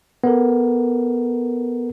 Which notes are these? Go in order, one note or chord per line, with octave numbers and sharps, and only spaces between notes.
B3 A4 A#4